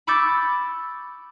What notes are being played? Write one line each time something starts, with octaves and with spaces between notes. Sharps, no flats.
B5 C#6 D6 E6 G6 A6